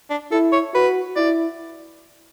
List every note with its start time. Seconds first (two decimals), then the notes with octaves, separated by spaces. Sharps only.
0.10 D4
0.31 E4 A4
0.52 C#5
0.74 F#4 B4
1.16 E4 D5